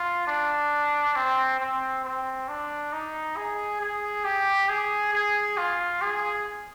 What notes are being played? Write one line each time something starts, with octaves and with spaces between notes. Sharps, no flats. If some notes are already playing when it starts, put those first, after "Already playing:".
Already playing: F4
D4
C4
C4
C4
D4
D#4
G#4
G#4
G4
G#4
G#4
F4
G#4